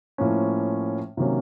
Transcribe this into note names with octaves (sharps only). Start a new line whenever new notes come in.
A2 F3 A#3 C#4
C3 D#3 F#3 A#3 C#4